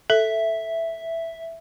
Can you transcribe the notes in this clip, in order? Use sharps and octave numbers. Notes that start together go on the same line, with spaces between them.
A4 E5